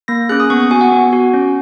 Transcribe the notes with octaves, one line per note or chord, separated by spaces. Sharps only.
A#3 A#6
C#4 G#4 F#6
D#6
B3 C#6
C#6
F#4 G#5
F#5
B3
F#4
C#4